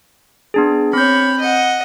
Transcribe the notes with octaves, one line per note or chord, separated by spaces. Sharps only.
B3 D4 G#4
C4 C#5 B5 G6
D#5 F#5